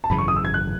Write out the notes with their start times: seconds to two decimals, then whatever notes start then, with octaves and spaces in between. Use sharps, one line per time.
0.04 A5
0.10 G#1 F#2 C#3 E3 B5
0.18 C#6
0.28 D#6
0.36 E6
0.45 G#6
0.54 F#6